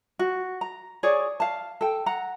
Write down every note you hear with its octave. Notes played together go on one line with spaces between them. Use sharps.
F#4
A#5
G#4 C#5 D5
F5 A5
A4 G5
F#5 A#5